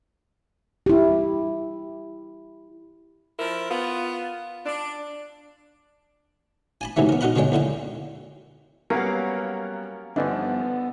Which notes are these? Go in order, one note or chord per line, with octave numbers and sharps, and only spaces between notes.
E4 G4
F3 E4 A#4
B3 F4
D4
G#5 A5 B5
G#2 C3 D#3 E3 F#3 A3
B3 A#4
D#4 F#4 A#4 F#5 A#5 B5
B2 D3 G#3 C#5 G5
A#1 D3 E4 G5
F#3 G3 A#3 B3 C#4 A#4 F5 F#5
G1 D3 E3 F3 B3 D4 D#4